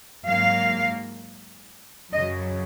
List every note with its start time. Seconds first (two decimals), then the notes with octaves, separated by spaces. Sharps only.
0.25 G#2 F#3 A#3 F5
2.12 F#2 C#3 F#3 D#5